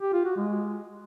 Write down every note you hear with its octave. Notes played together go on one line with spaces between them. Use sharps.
G4
F4
F#4
G#3